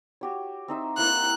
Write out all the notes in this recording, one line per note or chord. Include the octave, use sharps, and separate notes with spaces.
F#4 G4 C#5
C4 D#4 E5
A#3 E4 A#4 F#6